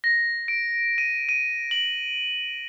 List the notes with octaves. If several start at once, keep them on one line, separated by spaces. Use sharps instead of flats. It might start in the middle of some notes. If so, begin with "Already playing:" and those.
A#6
D7
D#7
D#7
F#7